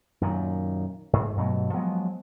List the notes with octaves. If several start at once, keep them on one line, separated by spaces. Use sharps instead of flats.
F#2 A#2 D#3
G#2
G2 B2 F#3 A3
F3 F#3 G#3 B3